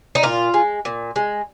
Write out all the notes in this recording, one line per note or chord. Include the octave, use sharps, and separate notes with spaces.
D#4
A#2 F4
G#3
A#2
G#3